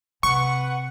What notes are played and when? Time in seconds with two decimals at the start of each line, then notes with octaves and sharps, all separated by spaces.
0.23 C3 B4 F#5 C#6